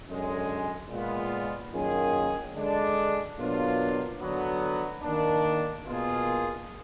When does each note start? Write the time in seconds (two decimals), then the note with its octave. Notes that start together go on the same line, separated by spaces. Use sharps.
0.09 F#2 D3 G#3
0.90 A#2 G#3 B3 F4
1.73 F#2 D#3 A#3 F4 G#4
2.55 D3 G#3 D4
3.37 B2 F#3 A#3 D4 F4
4.20 D3 F#3 B3
5.03 D#3 A#3 D4
5.85 B2 A#3 F4 G#4